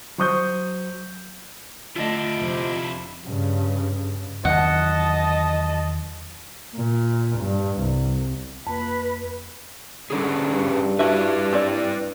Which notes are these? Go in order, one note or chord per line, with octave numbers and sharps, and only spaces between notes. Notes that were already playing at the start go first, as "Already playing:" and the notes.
F#3 C5 C#6 D#6 G6
D3 A3 D4 E4 F4 D#5
F2 C3
G2 C#3
E2 D#3 F#3 D#5 F#5 A5
A#2
G2
C2
F2 A#3 B4 B5
D3 G3 C#4 G#4
G2
D4 E4 F#4 B4 E5
C4 E4 D5